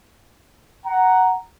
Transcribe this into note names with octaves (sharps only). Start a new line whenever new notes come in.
F#5 A#5